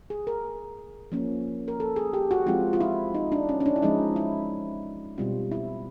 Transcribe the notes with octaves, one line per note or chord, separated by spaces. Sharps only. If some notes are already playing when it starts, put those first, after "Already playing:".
G#4
A#4
F3 A#3 C#4
A#4
A4
G#4
G4
F#4
F3 G#3 C4 F4
F4
E4
D#4
D4
C#4
C#4
D4
E4
F3 G#3 C#4 D#4
E4
B2 G3 C4 F4
E4